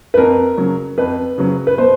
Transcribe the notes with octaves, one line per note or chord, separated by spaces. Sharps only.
B4
F2 A#4
C#3 F#3
F2 B4
C#3 F#3
B4
B2 C5